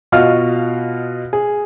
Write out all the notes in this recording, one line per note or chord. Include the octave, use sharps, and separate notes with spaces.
B2 F4 F#4 D#5 F5 F6
G#4